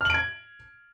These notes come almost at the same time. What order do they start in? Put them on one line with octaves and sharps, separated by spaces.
F6 F#7 D7 G#6